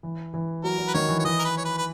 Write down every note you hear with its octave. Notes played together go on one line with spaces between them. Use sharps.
E3
E3
F#3 A#4
F#3
B4
D#3 C#5
E3
C#5
E3 D#5
A#4
B4
C#5
B4
B4